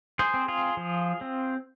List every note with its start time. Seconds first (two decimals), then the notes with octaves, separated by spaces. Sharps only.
0.19 G#4 C5
0.34 C4
0.48 F4 G#4
0.77 F3
1.21 C4